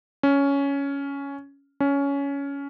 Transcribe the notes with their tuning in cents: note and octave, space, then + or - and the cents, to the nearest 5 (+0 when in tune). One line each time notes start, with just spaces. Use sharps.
C#4 +10
C#4 +15